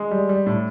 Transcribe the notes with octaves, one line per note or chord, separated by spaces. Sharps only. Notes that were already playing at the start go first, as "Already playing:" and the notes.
Already playing: G#3
G3
G3
A2